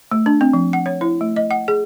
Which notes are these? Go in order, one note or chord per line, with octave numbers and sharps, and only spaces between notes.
A3
D4
C4
F3
F#5
C#5
E4
A3
D#5
F#5
G#4